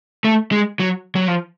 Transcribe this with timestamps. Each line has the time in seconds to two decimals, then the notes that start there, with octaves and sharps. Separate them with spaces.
0.24 A3
0.52 G#3
0.79 F#3
1.16 F#3
1.28 F3